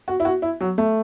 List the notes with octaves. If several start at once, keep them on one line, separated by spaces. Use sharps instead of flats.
F#4
E4
F#4
E4
F#3
A3